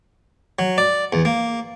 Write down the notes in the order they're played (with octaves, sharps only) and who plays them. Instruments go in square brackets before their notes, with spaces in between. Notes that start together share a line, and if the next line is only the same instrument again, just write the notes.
[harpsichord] F#3
D5
E2
A#3